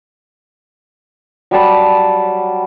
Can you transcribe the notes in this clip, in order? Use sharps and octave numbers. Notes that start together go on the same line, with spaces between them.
F#3 G3 A5 B5